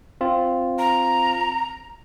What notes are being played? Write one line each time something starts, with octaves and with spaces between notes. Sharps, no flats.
C4 F4
A#5